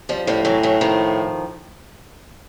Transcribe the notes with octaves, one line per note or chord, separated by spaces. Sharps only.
F3 G3
A2 F3 G3
E3 F#3
E3 F#3
D#3 F3